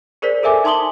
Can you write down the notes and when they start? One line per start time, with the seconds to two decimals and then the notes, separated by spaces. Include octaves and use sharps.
0.22 G#4 A#4 C5 D5 B6
0.43 A4 A#4 E5 G#5 D6
0.64 D#4 A5 C6 D#6 F#7 G7